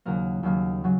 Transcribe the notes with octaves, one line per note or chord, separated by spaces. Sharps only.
D#2 C#3 F#3 A#3 A#4
D#2 C#3 F#3 A#3
C#3 F#3